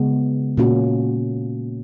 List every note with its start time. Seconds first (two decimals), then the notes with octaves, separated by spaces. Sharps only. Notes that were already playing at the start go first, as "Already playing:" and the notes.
Already playing: C#3 G#3 B3
0.57 A#2 A#3 C#4 F#4